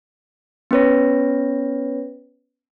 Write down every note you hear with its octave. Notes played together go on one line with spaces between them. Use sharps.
B3 C#4 B4 C#5 A#6